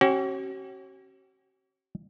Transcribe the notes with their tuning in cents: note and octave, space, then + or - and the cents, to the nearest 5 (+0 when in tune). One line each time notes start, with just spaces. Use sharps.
C#4 -35 F#4 +45